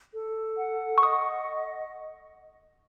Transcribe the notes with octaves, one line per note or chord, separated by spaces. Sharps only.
A4
F#5
C#6
D#5 D#6